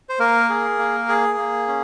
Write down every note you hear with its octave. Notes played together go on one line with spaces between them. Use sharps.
C5
A#3 A#4
G#4
A#3
G#4
A#3
C#4